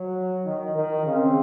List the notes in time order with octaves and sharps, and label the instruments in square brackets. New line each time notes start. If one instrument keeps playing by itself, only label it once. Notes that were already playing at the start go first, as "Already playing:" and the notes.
Already playing: [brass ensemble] F#3
D#3
D#3
[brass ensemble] C#3 [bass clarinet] C4